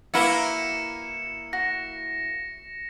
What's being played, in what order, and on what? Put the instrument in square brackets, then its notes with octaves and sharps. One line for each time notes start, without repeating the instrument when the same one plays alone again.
[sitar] A#3 E4 [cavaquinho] F#4 B4 E5 [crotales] C#7 E7
[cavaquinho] F#4 [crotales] A#6